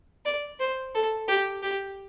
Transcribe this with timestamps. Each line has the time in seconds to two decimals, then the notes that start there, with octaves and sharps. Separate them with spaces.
0.25 D5
0.60 C5
0.94 A4
1.28 G4
1.62 G4